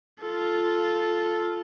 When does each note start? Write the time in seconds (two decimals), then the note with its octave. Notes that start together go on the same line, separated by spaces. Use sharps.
0.21 F4 A4